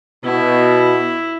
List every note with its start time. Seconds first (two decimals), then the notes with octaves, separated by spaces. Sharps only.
0.25 B2 E4